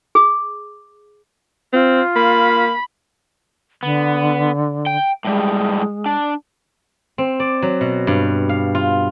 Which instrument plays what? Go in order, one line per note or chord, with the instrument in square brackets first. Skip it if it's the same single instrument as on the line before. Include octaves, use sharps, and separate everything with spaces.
[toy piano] G#4
[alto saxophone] C4 [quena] F4
[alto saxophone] A#3 [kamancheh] B5
[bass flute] D3 [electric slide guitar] B3
[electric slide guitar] G5
[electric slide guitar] A2 G3 [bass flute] G#3
[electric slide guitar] D4
[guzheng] C4
D5
F#3
B2
G2
F5
F4